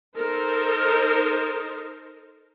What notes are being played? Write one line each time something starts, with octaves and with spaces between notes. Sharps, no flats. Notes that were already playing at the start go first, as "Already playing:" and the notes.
D#4 A4 A#4 C5